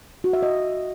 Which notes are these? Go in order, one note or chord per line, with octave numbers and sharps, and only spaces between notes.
F#4
E5
D#5